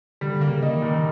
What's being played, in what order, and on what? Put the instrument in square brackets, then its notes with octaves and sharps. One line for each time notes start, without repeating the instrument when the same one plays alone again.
[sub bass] D3 [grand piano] G3
[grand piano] A#3
[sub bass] C#3
[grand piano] D#4
[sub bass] D#3
[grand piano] A#2